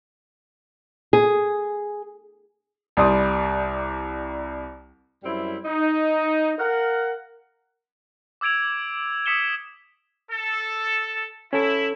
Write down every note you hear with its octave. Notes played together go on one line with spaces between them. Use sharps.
G#4
C2 G3 D5 C6 D#6
F#2 G3 C4 E4
D#4
A#4 F5 F#5
D6 E6 G#6 D7 F7
D#6 E6 B6 C#7 E7 G7
A4
C#4 E4 A4